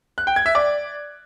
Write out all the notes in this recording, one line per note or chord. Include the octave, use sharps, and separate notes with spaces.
F#6
G5
G#6
E5
D5